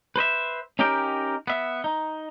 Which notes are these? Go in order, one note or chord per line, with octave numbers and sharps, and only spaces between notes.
B4 C5 D#5 E5
C#4 D#4 G4 A#4 G5
B3 E5
D#4